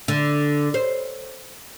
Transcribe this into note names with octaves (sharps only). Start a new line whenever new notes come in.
D3
C5